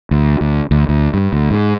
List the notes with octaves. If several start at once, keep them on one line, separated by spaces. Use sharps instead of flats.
D2
D2
D2
D2
G2
D2
G#2